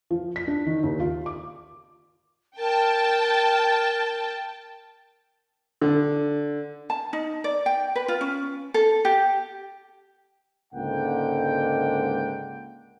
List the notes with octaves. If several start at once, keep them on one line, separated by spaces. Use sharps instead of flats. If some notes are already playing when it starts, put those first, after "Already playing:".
F3
B6
D4
D#3
D#2
F4
D6
A#4 G5 A5
D3
A5
D#4
D5
G5
B4
F4
C#4
A4
G4
C#2 G#2 D3 A#3 F#5 G5